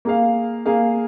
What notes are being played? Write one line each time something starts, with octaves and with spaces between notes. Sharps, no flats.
A#3 G#4 F5
A#3 G#4 F5